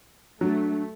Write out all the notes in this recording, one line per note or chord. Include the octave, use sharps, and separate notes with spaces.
F#3 A3 D4